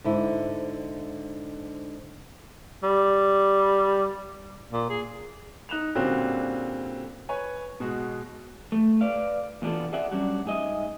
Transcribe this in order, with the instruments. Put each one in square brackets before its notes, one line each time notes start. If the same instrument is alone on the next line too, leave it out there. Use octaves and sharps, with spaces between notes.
[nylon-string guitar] G#2 D3 E4
[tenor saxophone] G3
A#2
G#4
[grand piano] D#4 F#6 E7 F7
A#2 D3 G3 C4 C#4 F#4
B4 C#5 G#5
B2 G#3 F#4
[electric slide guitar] A3
B4 D5 F5
E2 B2 B3 D4 F4 A4
G#4 D5 E5 F#5
F#3 G3 C#4 D4 F#4
G#2 G#4 D#5 E5